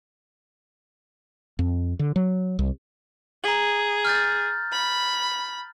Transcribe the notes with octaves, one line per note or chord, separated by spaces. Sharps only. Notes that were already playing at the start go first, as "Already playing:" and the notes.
F2
D3
F#3
C2
G#4 A#5 F#7
F6 G6 A6
B5